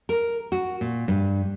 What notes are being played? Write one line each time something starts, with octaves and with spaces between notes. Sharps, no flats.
A#4
F#4
A#2
G2